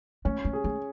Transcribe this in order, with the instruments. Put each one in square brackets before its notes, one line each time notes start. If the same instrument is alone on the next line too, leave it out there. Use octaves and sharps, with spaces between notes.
[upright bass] A3 [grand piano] C#4
[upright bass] A3
[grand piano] G#4
[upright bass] A3